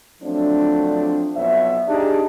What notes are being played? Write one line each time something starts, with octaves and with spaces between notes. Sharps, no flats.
F3 F#3 A3 C4 D4
B1 F2 B3 C#5 E5
D4 D#4 G4 G#4